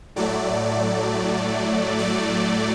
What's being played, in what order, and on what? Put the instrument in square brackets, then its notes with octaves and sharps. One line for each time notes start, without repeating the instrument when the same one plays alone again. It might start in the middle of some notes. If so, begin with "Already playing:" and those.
[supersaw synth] A2 F#3 A3 D5
D5